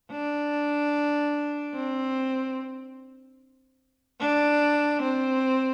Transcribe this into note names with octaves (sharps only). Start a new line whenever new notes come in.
D4
C4
D4
C4